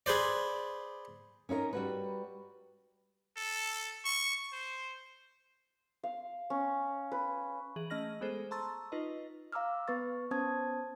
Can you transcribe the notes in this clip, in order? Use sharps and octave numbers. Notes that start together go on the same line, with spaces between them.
G#4 B4 C5 D5
C#4 D#4 E4 A#4
G3 F#4 B4
A4
C#6
C5
F5
C#4
B4
E3 G#4 F#7
A3 C#4 D#5 F6 A#6 F#7
G#3 B3 G#4 A4 C5
A5 A#5 C6 C#6 E6 A6
D#4 F4 B4 D#5
F5 A#5 D6 E6 F6
B3 B4 C#6 A6
B3 C#4 C5 A5 D#6 G#6